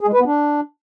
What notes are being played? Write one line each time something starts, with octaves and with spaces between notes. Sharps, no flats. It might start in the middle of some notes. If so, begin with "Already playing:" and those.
G#4
G#3
B4
B3
D4